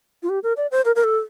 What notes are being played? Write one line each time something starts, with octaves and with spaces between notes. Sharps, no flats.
F4
G4
A#4
D5
C5
A#4
A#4
A4